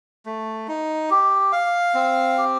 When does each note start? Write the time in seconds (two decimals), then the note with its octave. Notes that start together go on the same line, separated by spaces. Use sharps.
0.26 A3
0.68 D#4
1.10 G4
1.52 F5
1.94 C4
2.38 G4